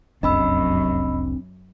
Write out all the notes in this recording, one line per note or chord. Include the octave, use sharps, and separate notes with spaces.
F1 C2 F#2 C4 D4 D#5 B5 E6